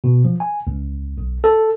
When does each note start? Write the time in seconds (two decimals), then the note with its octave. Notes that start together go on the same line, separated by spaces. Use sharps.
0.04 B2
0.25 F3
0.40 G#5
0.67 C#2
1.18 B1
1.44 A4